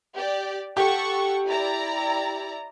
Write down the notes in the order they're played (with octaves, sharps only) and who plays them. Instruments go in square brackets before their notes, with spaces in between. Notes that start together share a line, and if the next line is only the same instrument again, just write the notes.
[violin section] G4 D5
[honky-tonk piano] G4 [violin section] A4 F#5 C#6
[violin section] E4 D5 A#5